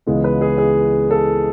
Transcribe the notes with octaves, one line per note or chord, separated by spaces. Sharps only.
C#2 C#3 E3 G#3 B3
B4
G#4
G#4
A4